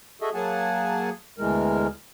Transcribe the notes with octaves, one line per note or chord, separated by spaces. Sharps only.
F#4 G#4 A4 D#5 E5
F#3 A#3 G#4 F#5 G#5 A5
D2 B2 E3 G#3 A#4